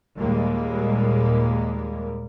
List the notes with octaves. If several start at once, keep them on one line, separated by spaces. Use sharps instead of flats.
D#2 A#2 G3 G#3 A#3